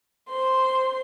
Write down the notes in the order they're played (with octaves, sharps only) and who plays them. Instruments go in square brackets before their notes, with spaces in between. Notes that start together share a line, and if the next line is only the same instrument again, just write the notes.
[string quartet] C5 C6